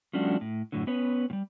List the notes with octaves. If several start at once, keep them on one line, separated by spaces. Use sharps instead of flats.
F3 G3 A3 C#4 D4 F#4
A2
F#2 A2 D3
B3 C#4 B4 C#5
A2 G3